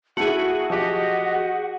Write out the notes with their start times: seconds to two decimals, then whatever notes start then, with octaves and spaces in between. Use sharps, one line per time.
0.17 A3 E4 F#4 G#4 F#5
0.70 F3 G4 D#5 F#5